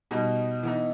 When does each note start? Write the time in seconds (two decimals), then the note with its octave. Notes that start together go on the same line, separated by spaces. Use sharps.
0.11 B2 G3 D#4
0.63 E3 B3 D#4